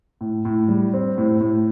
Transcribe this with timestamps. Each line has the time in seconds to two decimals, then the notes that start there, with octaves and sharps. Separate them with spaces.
0.21 A2
0.45 A2
0.69 G3
0.94 C4
1.18 A2
1.41 A2